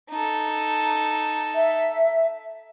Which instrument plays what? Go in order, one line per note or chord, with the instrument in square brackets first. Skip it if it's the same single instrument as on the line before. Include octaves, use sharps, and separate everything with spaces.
[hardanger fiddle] D#4 A4
[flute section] E5